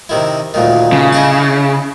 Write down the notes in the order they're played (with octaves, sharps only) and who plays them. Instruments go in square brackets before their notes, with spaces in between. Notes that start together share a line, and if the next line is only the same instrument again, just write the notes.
[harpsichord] C3 D#3 E4
D2 A#2 D#3
[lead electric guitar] C#3
[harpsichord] E4 D#5 A5